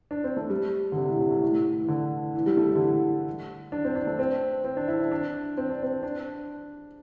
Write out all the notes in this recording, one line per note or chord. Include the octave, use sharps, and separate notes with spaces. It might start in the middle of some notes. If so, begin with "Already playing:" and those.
D4
C4
A3
G3
D3
C3
A2
C3
A2
A2
E3
D3
E3
G3
A3
G3
D3
E3
D4
C4
D4
A3
C4
C4
D4
E4
D4
D4
C4
D4
C4
D4